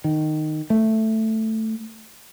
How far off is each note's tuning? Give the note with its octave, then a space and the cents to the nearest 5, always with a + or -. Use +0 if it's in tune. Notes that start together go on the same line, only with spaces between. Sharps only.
D#3 -10
A3 +5